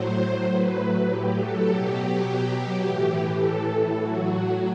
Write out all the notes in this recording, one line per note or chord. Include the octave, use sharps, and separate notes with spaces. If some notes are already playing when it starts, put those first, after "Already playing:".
Already playing: A2 F#3 C5
A2 F#3 B4
G4
A4
B2 F#3 G4
A2 E3
A4
A2 F#3 F#4